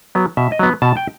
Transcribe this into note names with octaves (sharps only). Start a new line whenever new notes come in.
F#3 B3
B2 E5
D#5
F#3 B3
B2 A5
G5